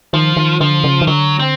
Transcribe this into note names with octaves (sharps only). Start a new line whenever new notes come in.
D#3 F3
D#3
D3 F3
C#3
D#3
D3 F#3
C4